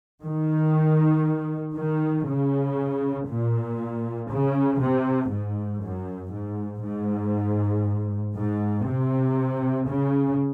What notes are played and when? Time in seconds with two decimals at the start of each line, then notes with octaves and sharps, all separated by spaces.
0.24 D#3
1.76 D#3
2.27 C#3
3.28 A#2
4.30 C#3
4.81 C3
5.31 G#2
5.82 F#2
6.32 G#2
6.83 G#2
8.36 G#2
8.87 C3
9.87 C#3